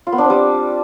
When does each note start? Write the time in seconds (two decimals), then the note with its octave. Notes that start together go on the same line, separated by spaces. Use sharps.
0.07 F4
0.12 B3
0.18 D4
0.24 C4
0.30 G3